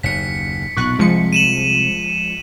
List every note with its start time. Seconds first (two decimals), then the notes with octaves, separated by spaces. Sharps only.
0.03 F#1 D#2 B6 C#7
0.77 B1 A#2 C#6 F#6
0.99 C2 F3 G#3 C#7
1.33 D#7 E7 F#7